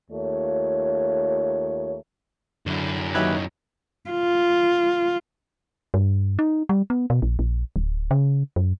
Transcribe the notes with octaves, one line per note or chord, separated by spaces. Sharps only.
D#2 A3 F4 C#5
F#2 D3 E4
D#2 F#3 D#4 G4 B4 C#5 E5 G#6
F4
G2
D#4
G3
B3
B2
A#1
A#1
D1
C#3
F#2